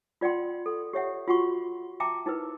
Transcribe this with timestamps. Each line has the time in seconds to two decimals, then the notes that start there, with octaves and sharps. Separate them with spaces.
0.21 F4 D5 F#5 G5 C6
0.66 A4
0.93 G4 C#5 E5 F#5
1.28 F4 F#4 F#5 C6 C#6
2.00 E5 G5 A5 A#5 D6
2.26 D#4 E4 A#4 B4